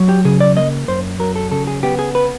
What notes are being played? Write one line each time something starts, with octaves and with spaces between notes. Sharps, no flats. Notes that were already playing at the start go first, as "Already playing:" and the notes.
Already playing: F#3
G4
C#3 G#4
D5
A#3 D#5
F#2 C5
F#3 A#4
A4
C#3 A4
G#4
B3 G4
G#4
B4